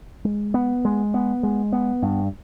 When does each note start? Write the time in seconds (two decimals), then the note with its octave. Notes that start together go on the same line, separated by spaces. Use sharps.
0.25 G#3
0.54 B3
0.85 G#3
1.14 B3
1.43 G#3
1.73 B3
2.02 G2